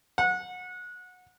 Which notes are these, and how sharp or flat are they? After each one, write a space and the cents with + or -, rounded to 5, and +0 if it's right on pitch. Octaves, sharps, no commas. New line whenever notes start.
F#5 -25